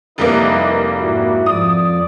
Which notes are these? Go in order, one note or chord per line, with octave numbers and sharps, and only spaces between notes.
F1 G3 A#3 E4 B4 D#5
G#2 E4 F#4
F2 F3 D5 D#6